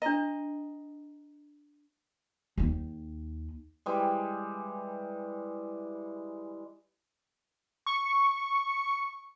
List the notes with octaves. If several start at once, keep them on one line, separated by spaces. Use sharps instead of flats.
D4 D#5 A#5
D#2 D#4
E3 G3 G#3
C#6